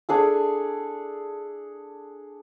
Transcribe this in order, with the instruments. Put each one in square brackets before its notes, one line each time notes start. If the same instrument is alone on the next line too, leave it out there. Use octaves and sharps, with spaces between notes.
[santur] D4 G#4 A4